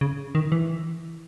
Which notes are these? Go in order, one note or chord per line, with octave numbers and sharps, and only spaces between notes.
C#3
D#3
E3